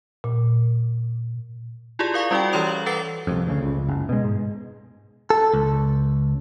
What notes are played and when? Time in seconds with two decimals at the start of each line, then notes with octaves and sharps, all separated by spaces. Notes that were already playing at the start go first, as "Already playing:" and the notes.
0.24 A#2
1.99 E4 F4 G4 G#4 D5
2.14 A#4 F5 C#6
2.31 G3 C#4 E4 F#4 D5 G5
2.53 E3 G4 C#5 A#5 D#6 F7
2.67 F#7
2.86 A4 B4 F#5 A6 C7 G7
3.27 C2 F2
3.47 D2 C#3
3.63 C#2
3.88 F#1
4.09 B2 G#3
4.24 G#2
5.30 A4
5.54 C#2